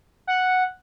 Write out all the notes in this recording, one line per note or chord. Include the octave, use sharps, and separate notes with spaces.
F#5